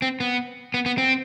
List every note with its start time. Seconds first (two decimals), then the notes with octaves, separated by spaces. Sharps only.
0.02 C4
0.20 B3
0.74 B3
0.86 B3
0.98 C4